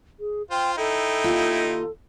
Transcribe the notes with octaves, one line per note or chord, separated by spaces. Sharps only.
G#4
F4 C5 G5
D#4 E4 A4 G5
D#2 F4